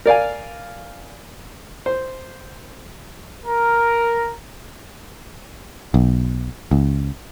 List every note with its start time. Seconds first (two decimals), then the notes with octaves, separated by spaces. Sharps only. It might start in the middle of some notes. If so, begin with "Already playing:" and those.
0.06 A#4 D5 F5 G#5
1.86 C5
3.46 A#4
5.94 B1
6.71 C#2